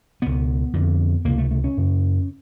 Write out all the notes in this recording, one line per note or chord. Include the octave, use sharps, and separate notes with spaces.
C#2 B2 B3
F2 D3
C#2 C3 A#3
A3
A3
C#4
F#2 C#3